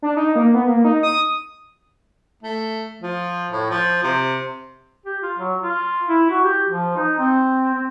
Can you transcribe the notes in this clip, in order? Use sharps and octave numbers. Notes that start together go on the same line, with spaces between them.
D4
D#4
A#3
B3
A#3
D#4
D#6
A3
F3
A2
F3
C3
G4
F4
F#3
F4
E4
F#4
G4
F3
D#4
C4
C4